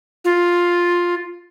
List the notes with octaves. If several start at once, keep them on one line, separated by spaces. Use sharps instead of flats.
F4